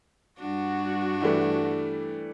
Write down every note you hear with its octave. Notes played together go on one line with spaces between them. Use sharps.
G2 D4 F#4
E3 G3 A3